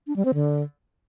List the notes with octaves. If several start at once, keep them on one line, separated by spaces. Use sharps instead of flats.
D4
G3
C4
D3